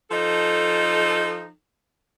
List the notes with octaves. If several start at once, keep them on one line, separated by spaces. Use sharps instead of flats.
F3 D#4 A4